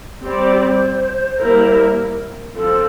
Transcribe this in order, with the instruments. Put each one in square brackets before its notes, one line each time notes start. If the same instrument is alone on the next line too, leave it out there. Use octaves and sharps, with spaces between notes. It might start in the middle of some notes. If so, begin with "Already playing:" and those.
[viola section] G3 C4 G4 D5 [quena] C5
[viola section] G3 A#3 E4 A#4
[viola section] F3 C4 [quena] A4